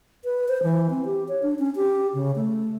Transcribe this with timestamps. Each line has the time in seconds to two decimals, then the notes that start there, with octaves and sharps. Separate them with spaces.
0.25 B4
0.48 C5
0.63 E3
0.90 C4
1.05 G4
1.28 C#5
1.43 D4
1.59 C#4
1.76 G4
2.14 C#3
2.36 A3